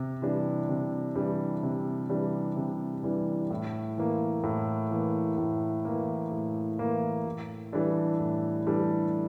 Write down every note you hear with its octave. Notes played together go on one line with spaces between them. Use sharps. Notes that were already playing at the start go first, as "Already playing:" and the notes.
Already playing: C3
E3 G3 D4
C3
E3 G3 D4
C3
E3 G3 D4
C3
E3 G3 D4
A2
E3 A#3
A2
E3 A#3
A2
E3 A#3
A2
E3 A#3
A2
E3 G3 D4 A4
A2
E3 G3 D4 A4